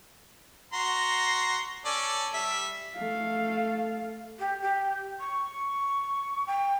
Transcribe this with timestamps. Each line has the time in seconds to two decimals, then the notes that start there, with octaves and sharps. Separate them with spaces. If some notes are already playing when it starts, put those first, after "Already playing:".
0.73 F#4 A#5 C6
1.85 C#4 A4 D5
2.34 G3 E5
2.96 A3 F5
4.39 G4
4.62 G4
5.20 C#6
6.47 G5